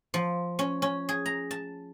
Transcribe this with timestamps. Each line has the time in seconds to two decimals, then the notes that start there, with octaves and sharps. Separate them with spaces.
0.14 F3
0.59 C#4
0.82 C#4
1.09 G#4
1.26 A#5
1.51 A5